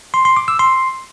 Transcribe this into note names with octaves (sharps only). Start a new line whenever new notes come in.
C6
C6
D6
E6
C6